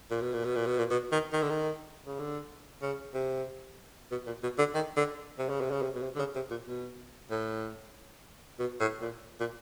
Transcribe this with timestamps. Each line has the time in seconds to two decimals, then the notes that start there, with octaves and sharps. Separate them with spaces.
0.10 A#2
0.21 B2
0.33 A#2
0.44 B2
0.56 A#2
0.66 B2
0.78 A#2
0.90 B2
1.12 D#3
1.32 D#3
1.42 D3
1.49 D#3
2.06 C#3
2.19 D3
2.82 C#3
3.14 C3
4.11 B2
4.26 A#2
4.43 B2
4.58 D3
4.74 D#3
4.96 D3
5.38 C3
5.49 C#3
5.61 C3
5.71 C#3
5.82 C3
5.95 B2
6.02 C3
6.15 D3
6.19 C#3
6.35 C3
6.50 A#2
6.67 B2
7.30 A2
8.59 B2
8.80 A2
9.02 A#2
9.40 A#2